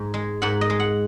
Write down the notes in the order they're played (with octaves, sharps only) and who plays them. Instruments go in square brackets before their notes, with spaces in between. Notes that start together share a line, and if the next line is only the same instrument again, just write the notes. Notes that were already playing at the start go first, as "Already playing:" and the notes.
Already playing: [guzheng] G#2
G#3
G#2 F#5
D#5
G#3
F#5